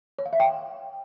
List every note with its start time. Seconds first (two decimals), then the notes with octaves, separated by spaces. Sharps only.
0.19 C#5
0.26 F5
0.33 E5
0.40 G5